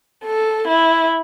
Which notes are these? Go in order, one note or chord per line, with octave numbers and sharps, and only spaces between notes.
A4
E4